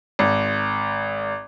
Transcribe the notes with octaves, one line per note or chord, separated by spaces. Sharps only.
G#1